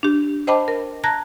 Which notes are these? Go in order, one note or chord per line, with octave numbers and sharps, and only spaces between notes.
D4 G4
C5 D#5 G5 A5 B5 D6
A#4
A5 A#5 F#6 G#6 A#6